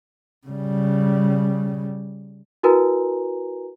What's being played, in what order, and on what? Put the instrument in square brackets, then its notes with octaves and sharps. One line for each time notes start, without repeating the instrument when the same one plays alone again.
[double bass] C#3 G3
[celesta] E4 F#4 A#4 B4 G#5 A#5